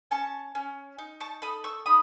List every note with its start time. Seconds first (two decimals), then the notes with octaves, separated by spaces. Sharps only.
0.11 C#4 A5 C#6
0.55 C#4
0.99 D#4
1.20 A5 C#6
1.42 A4 B5 D#6
1.64 C#6 E6
1.86 D#4 B5 D#6